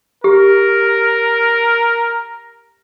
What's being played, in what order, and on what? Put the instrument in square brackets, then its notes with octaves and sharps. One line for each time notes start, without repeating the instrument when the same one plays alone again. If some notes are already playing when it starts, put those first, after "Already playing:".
[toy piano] G4 [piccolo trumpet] A#4